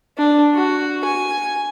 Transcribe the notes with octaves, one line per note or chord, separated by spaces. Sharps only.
D4
F#4
G#5